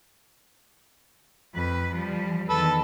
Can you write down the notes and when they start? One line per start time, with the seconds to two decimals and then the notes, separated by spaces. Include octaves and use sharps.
1.54 F2 B4
1.93 F3 G3
2.49 E2 D#3 A4 B4